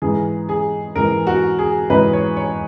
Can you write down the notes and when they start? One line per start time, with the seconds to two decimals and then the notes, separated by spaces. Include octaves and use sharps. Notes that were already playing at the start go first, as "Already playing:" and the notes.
0.02 G#2 E3 G#4
0.49 G#4
0.96 G#2 E3 A#4
1.27 F#4
1.59 G#4
1.90 G#2 E3 B4
2.13 C#5
2.37 C#5